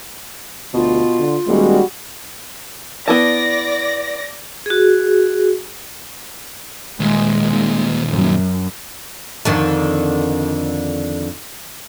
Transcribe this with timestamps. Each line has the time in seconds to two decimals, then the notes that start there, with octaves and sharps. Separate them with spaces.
0.74 D2 B2 F4
1.19 D3
1.48 D#1 G3 G#3 F#4
3.08 B3 E4 D5 A5 A#6
4.66 F#4 G#4
7.00 D#2 A#2 G#3
8.09 F#2
9.45 F2 D3 D#3